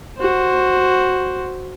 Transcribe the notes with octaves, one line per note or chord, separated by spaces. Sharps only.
F#4 C5